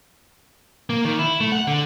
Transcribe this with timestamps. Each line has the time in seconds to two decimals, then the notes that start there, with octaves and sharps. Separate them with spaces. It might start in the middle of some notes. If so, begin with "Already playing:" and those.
0.90 A#3
1.05 D#3
1.19 E4
1.40 A3
1.52 F#5
1.67 D3